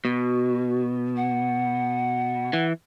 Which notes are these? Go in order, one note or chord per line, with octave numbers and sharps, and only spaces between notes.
B2 F#4
F#5
E3